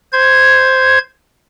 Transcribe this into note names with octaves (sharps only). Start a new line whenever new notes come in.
C5 G#6